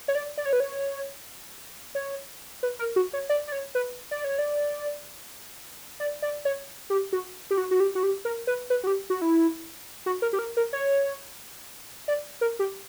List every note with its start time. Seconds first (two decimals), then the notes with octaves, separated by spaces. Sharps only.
0.08 C#5
0.15 D5
0.38 D5
0.46 C#5
0.53 B4
0.60 C#5
1.95 C#5
2.63 B4
2.79 A#4
2.96 F#4
3.13 C#5
3.29 D5
3.47 D5
3.52 C#5
3.75 B4
4.11 D5
4.24 C#5
4.39 D5
6.00 D5
6.22 D5
6.45 C#5
6.90 G4
7.13 F#4
7.51 G4
7.58 F#4
7.71 F#4
7.80 G4
7.95 F#4
8.03 G4
8.25 A#4
8.47 B4
8.70 B4
8.84 F#4
8.87 G4
9.10 F#4
9.22 E4
10.06 F#4
10.22 A#4
10.33 G4
10.39 A#4
10.57 A#4
10.73 C#5
12.08 D5
12.41 A#4
12.59 G4